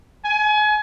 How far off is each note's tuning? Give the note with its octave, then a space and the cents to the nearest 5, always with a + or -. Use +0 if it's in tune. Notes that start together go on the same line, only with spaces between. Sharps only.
G#5 +30